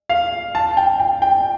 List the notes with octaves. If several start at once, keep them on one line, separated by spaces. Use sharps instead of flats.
F5
A5
G5
G5
G5